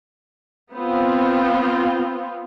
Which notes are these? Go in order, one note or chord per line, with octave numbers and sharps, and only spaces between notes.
B3 C4 F4